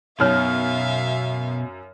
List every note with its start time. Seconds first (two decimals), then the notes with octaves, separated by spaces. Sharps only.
0.20 F#2 B2 D#4 C#5 E5 F5 F6